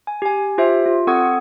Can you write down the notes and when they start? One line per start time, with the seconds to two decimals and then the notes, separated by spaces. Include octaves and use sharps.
0.07 G#5
0.22 G4 G#5
0.58 F4 G4 C5 E5
0.86 F4
1.07 C4 A4 F#5 C#6 D#6 G#6